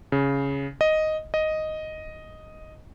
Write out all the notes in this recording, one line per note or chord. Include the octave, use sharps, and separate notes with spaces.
C#3
D#5
D#5